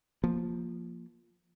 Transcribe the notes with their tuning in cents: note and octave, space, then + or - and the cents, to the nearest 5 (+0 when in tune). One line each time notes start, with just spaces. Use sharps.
F3 +0 A#3 +5